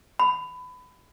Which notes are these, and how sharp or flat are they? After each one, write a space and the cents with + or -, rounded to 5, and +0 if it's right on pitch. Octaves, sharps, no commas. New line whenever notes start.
B5 +20